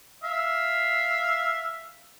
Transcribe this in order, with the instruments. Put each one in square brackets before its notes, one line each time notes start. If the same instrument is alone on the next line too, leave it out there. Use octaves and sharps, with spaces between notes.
[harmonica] E5 F5